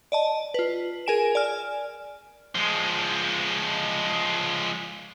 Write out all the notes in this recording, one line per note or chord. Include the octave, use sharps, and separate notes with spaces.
D5 D#5 A5
F4 B4
G#4 A#4 G#5 D7 E7
D5 G#5 F6
F3 G#3